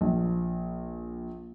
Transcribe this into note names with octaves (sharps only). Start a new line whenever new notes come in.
A#1